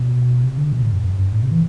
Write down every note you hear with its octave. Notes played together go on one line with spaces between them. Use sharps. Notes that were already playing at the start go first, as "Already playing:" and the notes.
Already playing: B2
C3
D3
B2
A2
F#2
F#2
G2
A2
C3
E3